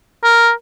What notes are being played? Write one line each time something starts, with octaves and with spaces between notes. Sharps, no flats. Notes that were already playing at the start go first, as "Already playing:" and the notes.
A#4